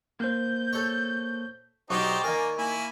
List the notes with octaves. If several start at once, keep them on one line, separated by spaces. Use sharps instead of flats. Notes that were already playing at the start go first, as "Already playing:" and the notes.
A#3 C5 G6
A4 C#5
B1 D#4 G4 C5 D5 C#6
D#3 A#3 A#4 G#5
A#3 E4 G#5